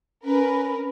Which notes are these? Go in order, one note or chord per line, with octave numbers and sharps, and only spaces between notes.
C#4 A#4 B4